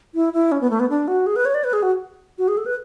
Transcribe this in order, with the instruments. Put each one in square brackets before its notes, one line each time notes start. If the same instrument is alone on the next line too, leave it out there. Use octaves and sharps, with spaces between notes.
[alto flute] E4
E4
C#4
B3
A3
B3
D4
F#4
G#4
B4
C#5
D5
B4
G#4
F#4
F#4
G#4
A4
B4